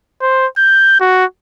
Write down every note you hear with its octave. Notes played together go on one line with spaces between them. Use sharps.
C5
G6
F#4